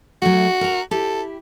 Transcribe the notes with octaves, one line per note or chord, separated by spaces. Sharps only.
F#3 A3 F#4
A#4 A#5
E4 G4 A4